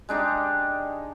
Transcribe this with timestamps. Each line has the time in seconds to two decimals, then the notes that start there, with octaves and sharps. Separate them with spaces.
0.09 G#3 D4 D#4 G4